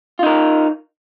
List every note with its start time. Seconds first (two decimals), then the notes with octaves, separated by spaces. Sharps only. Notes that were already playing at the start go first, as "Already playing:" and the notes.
0.19 F4
0.23 D#4
0.27 A#4